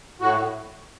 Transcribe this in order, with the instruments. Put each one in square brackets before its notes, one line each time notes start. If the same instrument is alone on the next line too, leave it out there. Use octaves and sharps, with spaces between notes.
[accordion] A2 F#4